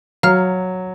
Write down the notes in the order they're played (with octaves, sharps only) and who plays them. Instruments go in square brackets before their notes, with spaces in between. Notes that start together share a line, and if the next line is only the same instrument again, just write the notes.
[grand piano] F#3 [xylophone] F5 A#5 F6